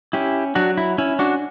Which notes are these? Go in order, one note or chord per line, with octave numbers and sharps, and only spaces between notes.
C#4 E4 G4
F#3 D4 F#4
E4
C#4 E4
D4 F#4